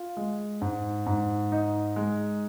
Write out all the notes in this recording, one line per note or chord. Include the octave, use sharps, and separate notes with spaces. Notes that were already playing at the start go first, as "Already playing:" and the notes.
Already playing: F4
G#3
G#2
G#2
D#4
G#3